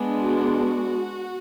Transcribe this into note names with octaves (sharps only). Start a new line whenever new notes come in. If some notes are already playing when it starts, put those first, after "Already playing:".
Already playing: G#3 B3 D4
F#4